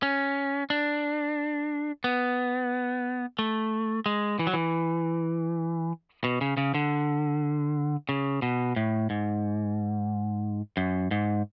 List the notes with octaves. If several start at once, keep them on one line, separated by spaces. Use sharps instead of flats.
C#4
D4
B3
A3
G#3
E3
F#3
E3
B2
C#3
C#3
D3
C#3
B2
A2
G#2
F#2
G#2